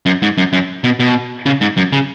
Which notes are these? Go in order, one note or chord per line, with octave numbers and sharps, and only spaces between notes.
F#2
G#2
F#2
F#2
B2
B2
C#3
G#2
F#2
C#3